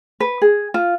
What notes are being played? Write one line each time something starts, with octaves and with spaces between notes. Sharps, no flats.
B4
G#4
F4